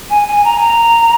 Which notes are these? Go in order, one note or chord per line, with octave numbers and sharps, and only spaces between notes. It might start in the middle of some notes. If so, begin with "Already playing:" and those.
G#5
G#5
A#5
A#5